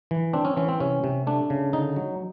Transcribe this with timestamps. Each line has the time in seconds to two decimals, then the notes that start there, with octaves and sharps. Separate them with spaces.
0.11 E3
0.33 C4 D4
0.45 C#4
0.57 E3 C#4
0.69 C4
0.80 C3 C#4
1.04 C3
1.27 A3 D4
1.50 C#3
1.73 D3 D#4
1.96 F#3